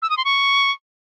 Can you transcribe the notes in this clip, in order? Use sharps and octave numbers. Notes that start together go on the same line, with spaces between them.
E6
D#6
C6
C#6